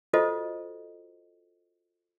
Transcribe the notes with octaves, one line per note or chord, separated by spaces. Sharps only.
F4 F#4 A4 C5 D#5